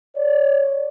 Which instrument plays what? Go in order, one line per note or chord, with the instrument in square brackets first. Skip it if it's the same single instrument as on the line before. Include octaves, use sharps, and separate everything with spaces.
[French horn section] C#5 D5